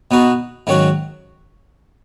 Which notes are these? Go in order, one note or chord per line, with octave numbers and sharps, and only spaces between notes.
B2 B3 D#4 F#4
G#2 D#3 F#3 C#4 F#4